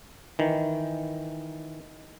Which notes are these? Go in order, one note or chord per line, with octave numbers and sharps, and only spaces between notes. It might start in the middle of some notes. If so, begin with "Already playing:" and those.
D#3 E3